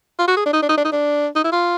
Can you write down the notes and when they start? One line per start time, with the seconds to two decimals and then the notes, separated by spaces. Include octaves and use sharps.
0.19 F4
0.28 F#4
0.37 G#4
0.46 D4
0.53 D#4
0.62 D4
0.69 D#4
0.77 D4
0.85 D#4
0.92 D4
1.36 D#4
1.44 E4
1.52 F4